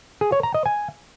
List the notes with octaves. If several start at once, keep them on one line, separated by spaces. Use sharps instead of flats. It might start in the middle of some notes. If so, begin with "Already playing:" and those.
G#4
C#5
A#5
D#5
G#5